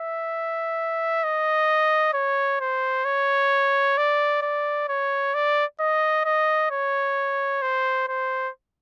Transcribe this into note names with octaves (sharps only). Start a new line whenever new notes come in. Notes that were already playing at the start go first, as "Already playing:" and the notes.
Already playing: E5
D#5
C#5
C5
C#5
D5
D5
C#5
D5
D#5
D#5
C#5
C5
C5